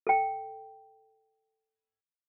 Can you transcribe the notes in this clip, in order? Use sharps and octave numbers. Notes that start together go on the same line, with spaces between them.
A4 G5